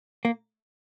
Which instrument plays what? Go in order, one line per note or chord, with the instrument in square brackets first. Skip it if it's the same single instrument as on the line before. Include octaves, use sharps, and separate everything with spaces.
[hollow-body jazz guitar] A#3